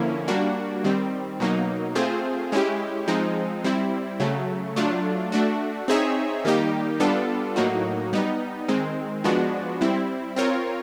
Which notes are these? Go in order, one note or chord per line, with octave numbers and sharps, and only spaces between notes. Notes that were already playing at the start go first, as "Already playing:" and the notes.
Already playing: D3 F3 A#3 C#4 E4
G3 A#3 D4 F#4
D#3 G3 C4
B2 F#3 A#3 D#4
A3 C4 F4 G#4 C5
G#3 C#4 E4 G4
F3 G#3 C4 D#4
G3 C4 E4
C#3 F#3 A3
F#3 A3 D4 F4
A3 D4 F#4
C4 D#4 G#4 C#5 E5
D#3 G3 A#3 D#4 G4
G3 B3 D4 F4 A4
A2 F#3 A#3 D#4 F#4
G3 B3 D#4
D#3 G#3 C4
F3 G#3 B3 D4 F#4
G3 C4 E4
C4 F4 A#4 C#5